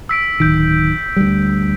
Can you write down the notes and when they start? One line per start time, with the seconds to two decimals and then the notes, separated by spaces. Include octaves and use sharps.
0.09 E6 B6 D7
0.40 D1 D#3 G6 D7
1.16 D2 G3